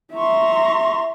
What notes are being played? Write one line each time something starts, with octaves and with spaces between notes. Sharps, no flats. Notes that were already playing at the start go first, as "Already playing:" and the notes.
E5 A#5 C6 C#6